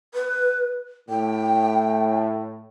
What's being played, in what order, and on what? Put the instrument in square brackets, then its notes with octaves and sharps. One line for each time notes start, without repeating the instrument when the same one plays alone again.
[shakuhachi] B4
[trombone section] A2 [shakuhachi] G5